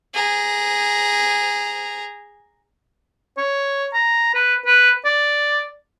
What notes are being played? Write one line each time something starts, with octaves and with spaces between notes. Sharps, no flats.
G#4 A#5
C#5
A#5
B4
B4
D5